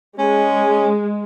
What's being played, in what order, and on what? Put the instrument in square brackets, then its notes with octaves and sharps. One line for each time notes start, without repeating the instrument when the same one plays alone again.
[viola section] G#3 [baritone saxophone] C#4